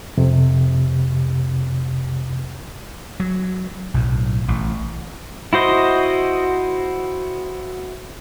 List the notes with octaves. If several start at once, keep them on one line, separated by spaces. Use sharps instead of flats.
F2 C3
F#3
B1 A2
A1
E4 F#4 C5 D#5